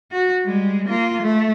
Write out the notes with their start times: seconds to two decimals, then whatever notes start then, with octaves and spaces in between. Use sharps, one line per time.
0.11 F#4
0.44 G3 G#3
0.88 A#3 F4
1.21 A3